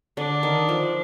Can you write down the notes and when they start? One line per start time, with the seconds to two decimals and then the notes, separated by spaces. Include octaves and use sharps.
0.17 D3 D4
0.43 D#3
0.69 F3